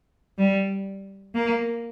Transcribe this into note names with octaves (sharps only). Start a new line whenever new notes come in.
G3
A#3